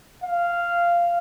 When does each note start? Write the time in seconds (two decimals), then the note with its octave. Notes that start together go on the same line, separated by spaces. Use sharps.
0.23 F5